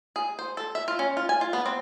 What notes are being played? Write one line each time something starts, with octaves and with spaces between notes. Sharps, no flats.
G#4
C5
A4
E5
F4
C#4
F4
G#5
F4
B3
C4